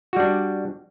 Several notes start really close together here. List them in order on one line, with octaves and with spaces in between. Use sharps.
F#4 G3 D4